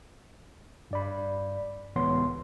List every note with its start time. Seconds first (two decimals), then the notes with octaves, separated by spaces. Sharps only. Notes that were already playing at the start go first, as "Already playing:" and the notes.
0.91 G2 D5 B5
1.96 C#2 A2 E3 B3 C#5 C6